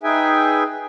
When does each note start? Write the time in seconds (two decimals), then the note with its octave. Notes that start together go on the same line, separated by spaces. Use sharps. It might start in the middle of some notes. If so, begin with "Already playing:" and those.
0.03 D#4 G#4 B4 E5 G5 G#5